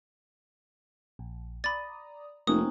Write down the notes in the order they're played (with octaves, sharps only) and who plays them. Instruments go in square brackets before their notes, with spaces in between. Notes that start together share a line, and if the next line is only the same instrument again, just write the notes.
[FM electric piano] A#1
[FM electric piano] D5 A#5 D#6 [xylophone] B5 A6
[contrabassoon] F1 [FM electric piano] A#3 F4 [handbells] C4 C#4 D#4 [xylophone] D#6